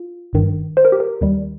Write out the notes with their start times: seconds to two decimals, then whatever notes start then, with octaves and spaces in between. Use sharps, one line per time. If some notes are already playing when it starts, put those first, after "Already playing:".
Already playing: F4
0.33 G1 G2 D#3
0.77 C5
0.85 A#4
0.92 G4
1.00 A#4
1.21 D#2 D#3 G3